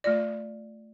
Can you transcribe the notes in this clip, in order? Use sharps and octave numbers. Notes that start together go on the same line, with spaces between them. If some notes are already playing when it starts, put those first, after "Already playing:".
A3 F4 D5